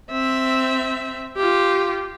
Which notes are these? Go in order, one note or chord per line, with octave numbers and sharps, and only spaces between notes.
C4 E5
F4 G4